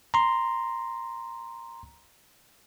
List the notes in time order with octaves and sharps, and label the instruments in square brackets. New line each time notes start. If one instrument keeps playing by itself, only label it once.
[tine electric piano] A#5 C6